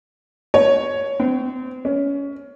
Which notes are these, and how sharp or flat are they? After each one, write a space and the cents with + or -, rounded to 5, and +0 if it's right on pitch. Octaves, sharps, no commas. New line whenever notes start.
C#5 +0
C4 -30
C#4 +20